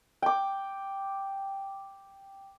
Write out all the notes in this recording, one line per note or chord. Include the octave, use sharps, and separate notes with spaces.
G5 D6